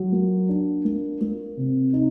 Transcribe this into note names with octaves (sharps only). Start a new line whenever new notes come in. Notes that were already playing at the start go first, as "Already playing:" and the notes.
Already playing: F#3
A#3
D4
A#3
A#3
C3
D#4